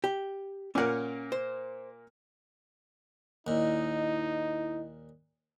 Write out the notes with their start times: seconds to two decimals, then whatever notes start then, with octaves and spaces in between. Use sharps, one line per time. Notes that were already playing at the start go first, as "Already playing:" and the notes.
0.04 G4
0.75 A#2 A#3 C#4 A#4 F#5
1.32 C5
3.47 D#2 A#2 D#4 E4 D#5